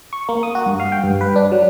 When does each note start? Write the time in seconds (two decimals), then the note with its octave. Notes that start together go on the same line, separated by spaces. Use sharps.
0.13 C#6
0.29 A#3
0.43 D#6
0.55 F#4
0.66 G2
0.80 F5
0.92 G5
1.04 G2
1.21 B4
1.36 D4
1.52 F#3